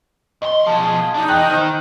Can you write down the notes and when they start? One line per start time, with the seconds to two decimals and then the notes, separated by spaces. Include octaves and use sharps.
0.42 D#2 D#5 C6
0.67 B2 F3 G#4 A5
1.14 B2 D4 D#4
1.28 E2 G5 F#6 F#7
1.50 D#3 C5